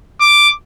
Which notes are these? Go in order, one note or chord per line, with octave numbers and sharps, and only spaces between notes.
D6